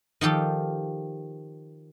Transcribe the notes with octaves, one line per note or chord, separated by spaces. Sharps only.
D#3 F3 G4 A4